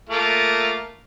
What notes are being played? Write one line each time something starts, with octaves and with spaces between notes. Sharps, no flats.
A3 A#3 F4